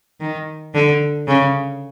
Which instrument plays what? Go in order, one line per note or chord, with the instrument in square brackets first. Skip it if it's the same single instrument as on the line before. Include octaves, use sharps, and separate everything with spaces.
[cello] D#3
D3
C#3